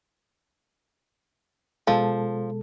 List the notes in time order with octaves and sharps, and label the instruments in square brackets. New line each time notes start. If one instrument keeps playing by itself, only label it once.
[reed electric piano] B2 G#3 A4 [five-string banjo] F3